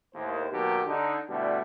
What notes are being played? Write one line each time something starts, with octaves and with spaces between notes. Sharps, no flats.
D#2 A2 C5
B2 D#3 F#3 A#3 D#4 G4
D3 D#4
B2 D3 G3 A3 D4 E4